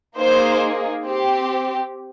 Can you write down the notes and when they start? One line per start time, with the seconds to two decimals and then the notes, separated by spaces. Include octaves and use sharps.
0.18 A#3 D#4 G#4 C5
1.04 C4 G4